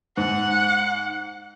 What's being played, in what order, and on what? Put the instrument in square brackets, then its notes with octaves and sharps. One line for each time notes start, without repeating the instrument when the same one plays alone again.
[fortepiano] G#2 [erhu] F#5